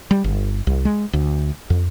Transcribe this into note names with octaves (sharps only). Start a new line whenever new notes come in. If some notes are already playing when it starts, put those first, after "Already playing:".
G3
G1
C2
G#3
D2
F2